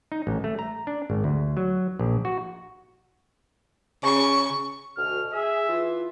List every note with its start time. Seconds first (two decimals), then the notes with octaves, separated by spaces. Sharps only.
0.12 D#4
0.27 A1
0.44 A3
0.59 A#5
0.87 D4
1.10 G#1
1.24 D2
1.57 F#3
1.99 A#1
2.25 F#4
4.04 C#3 C#6
4.97 D2 B2 F6
5.33 G#4 E5
5.69 E3 F4